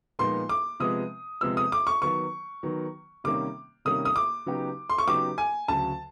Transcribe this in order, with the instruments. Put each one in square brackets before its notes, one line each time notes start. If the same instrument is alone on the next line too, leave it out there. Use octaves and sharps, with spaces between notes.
[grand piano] A#2 F3 G#3 B3 D#4 [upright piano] C6
[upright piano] D6
[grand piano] C3 F3 G#3 B3 [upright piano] D#6
[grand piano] C3 F3 G#3 B3 [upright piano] E6
[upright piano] D#6
D6
C#6
[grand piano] D#3 F#3 B3 [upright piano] C#6
[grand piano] D#3 F#3 B3
[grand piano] C3 D#3 G3 A#3 C#4 [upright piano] D6
[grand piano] C3 D#3 G3 A#3 C#4 [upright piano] D#6
[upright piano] D#6
D6
[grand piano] C#3 F#3 B3 D#4 G4
[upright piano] C6
C#6
[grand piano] C#3 F#3 B3 D#4 G4 [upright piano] D6
[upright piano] G#5
[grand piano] D2 C#3 F#3 [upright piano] A5